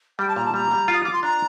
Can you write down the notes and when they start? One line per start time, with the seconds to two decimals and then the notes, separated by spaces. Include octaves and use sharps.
0.19 G3 G5
0.28 A5
0.36 A#2 A#5
0.45 A5
0.54 G3 A#5
0.71 G3
0.88 F4
0.94 D#6
1.04 F4 D6
1.13 C6
1.23 D4 A#5